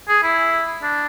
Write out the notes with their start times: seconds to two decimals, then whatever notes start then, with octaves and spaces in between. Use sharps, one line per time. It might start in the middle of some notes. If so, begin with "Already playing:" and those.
0.08 G#4
0.23 E4
0.83 D4